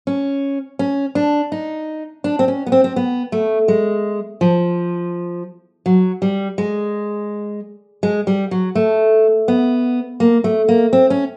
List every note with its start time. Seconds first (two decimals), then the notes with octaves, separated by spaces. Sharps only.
0.07 C#4
0.79 C#4
1.15 D4
1.52 D#4
2.24 D4
2.39 C4
2.48 C#4
2.66 B3
2.72 C4
2.84 C4
2.96 B3
3.32 A3
3.68 G#3
4.41 F3
5.86 F#3
6.22 G3
6.58 G#3
8.03 G#3
8.27 G3
8.51 F#3
8.75 A3
9.48 B3
10.20 A#3
10.44 A3
10.68 A#3
10.93 C4
11.10 C#4